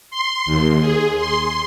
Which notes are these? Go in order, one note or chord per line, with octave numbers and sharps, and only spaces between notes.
C6
D#2
G#4
C6